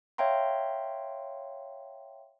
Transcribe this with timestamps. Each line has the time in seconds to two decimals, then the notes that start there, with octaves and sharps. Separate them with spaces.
0.18 C#5 E5 F5 G5 A#5 C6